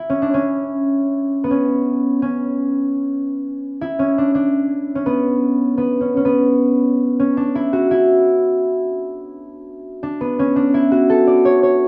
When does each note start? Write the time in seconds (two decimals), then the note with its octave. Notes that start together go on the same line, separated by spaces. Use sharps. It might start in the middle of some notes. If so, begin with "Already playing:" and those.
Already playing: E4
0.10 C#4
0.22 D4
0.34 C#4
1.44 B3
1.51 C#4
2.22 C#4
3.81 E4
3.99 C#4
4.18 D4
4.35 D4
4.95 C#4
5.06 B3
5.78 B3
6.01 C#4
6.17 C#4
6.25 B3
7.19 C#4
7.37 D4
7.55 E4
7.73 F#4
7.91 E4
10.03 D4
10.21 B3
10.39 C#4
10.56 D4
10.74 E4
10.92 F#4
11.10 A4
11.27 D5
11.45 C#5
11.63 C#5